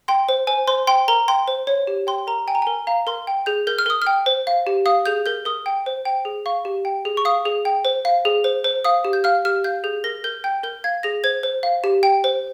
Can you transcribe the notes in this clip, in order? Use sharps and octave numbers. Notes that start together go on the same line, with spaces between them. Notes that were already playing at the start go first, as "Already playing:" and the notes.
G5 C6
C5
C5 G#5
C5 C6
G5 C6
A#4 A#5
G5 C6
C5
C#5
G4
G5 C6
A#4 A#5
G5 G#5
A#5
A#4 G#5
F5 A#5
A#4 C6
G5
G#4 G6
A#4 G6
F6
A#4 D#6
G5 F6
C5
F5
G4
F5 D#6
G#4 G6
A#4 G6
A#4 D#6
G5
C5
G5
G#4
F5 C#6
G4
G5
G#4
C#6
F5 D#6
G#4
G5
C5
F5
G#4
C5
C5
F5 D#6
G4
G6
F5 F6
G4 F6
F5 G6
G#4 G6
A#4 A#6
A#4 G6
G5 G6
A#4 G6
F5 G#6
G#4 A#6
C5 G#6
C5
F5
G4
G5
C5